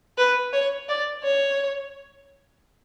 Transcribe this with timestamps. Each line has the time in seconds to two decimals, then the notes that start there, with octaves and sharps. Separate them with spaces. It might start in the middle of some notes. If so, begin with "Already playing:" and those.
0.18 B4
0.53 C#5
0.89 D5
1.24 C#5